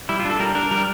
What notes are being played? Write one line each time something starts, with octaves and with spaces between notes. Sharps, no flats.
G3 E4
F4
D4 A4
G3 A#4
D4 A#4
G3 A#4